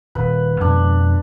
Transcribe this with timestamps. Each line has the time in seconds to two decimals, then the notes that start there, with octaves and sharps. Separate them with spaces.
0.15 D#1 B4
0.61 F2 B2 G#3 D4